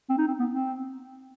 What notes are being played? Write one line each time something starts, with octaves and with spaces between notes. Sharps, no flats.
C4
D#4
C4
B3
C4